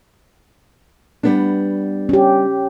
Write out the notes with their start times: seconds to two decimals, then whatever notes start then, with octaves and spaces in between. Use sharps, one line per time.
1.23 G3 B3 D4
2.09 C#4 G4